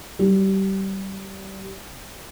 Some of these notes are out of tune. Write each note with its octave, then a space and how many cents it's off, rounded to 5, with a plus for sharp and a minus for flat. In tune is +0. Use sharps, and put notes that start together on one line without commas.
G3 -20